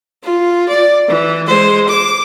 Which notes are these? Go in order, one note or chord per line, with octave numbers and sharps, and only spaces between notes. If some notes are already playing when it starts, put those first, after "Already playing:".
F4
D5
E3
G#3 C5
D6